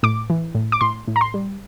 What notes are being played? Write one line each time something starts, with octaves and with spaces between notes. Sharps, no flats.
A2 D6
E3
A2
D6
A2 C6
A2
A#5
C6
G3